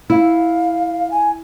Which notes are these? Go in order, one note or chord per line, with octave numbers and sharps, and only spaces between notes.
E4 F5
G#5